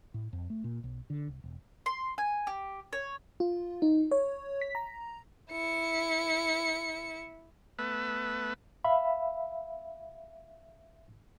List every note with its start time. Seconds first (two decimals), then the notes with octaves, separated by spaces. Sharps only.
0.14 A2
0.33 F2
0.50 A3
0.64 A#2
0.84 B1
1.10 D3
1.27 C2
1.44 E1
1.86 C6
2.18 G#5
2.47 G4
2.93 C#5
3.40 F4
3.82 D#4
4.11 C#5
4.61 B6
4.75 A#5
5.50 E4 C#7
7.79 A3 B3 B4 E6
8.84 E5 F5 B5